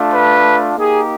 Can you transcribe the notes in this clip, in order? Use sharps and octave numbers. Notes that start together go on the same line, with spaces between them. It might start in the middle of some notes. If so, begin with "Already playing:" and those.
Already playing: A3 D4 F4
B4
A#3 D#4 G4 G#4